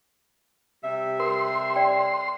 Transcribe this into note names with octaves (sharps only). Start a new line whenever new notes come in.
C3 G3 E5
A#4 C6
D5 G5